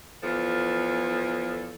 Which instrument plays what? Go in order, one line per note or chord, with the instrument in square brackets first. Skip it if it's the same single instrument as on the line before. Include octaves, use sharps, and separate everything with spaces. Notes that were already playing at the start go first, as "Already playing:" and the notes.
[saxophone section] E2 F3 A4